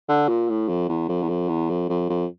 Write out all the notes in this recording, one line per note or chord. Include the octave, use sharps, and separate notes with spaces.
D3
A#2
A2
F2
E2
F2
E2
F2
E2
F2
F2
F2